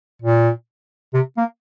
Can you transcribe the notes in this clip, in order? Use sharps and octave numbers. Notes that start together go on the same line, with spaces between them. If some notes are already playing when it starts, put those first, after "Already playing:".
A#2
C3
A#3